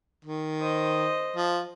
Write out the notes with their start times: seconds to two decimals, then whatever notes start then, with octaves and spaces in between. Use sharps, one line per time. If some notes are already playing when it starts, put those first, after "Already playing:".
0.24 D#3
0.60 C5 D#5
1.36 F3